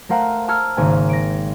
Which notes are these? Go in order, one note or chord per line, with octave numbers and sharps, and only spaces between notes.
A3 A#4 C5 F5 F#5 A#5
A5 A#5 E6 F6 G#6 C#7
G#1 C#3 A#3 G#5
A#6 D7